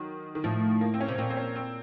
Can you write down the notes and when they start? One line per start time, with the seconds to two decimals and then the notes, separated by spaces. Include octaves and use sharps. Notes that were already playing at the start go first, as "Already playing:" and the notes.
Already playing: D#3 F#3
0.35 D#3
0.44 A2 F3
0.81 A#3
0.94 C4
1.00 C#4
1.08 C3
1.18 A#2 C4
1.30 C4
1.37 C#4
1.56 C4